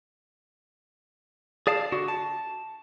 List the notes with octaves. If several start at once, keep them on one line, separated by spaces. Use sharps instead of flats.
G#4 D5 F5 A5
D3 F#4
A5